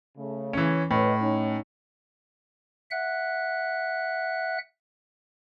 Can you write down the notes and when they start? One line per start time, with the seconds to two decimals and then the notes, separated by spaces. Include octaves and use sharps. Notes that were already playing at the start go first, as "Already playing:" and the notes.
0.17 C#3 A3
0.53 E3 C#4
0.91 A2 C#4 B4 D#5
1.21 C#4 D#4
2.91 E5 F#5 F#6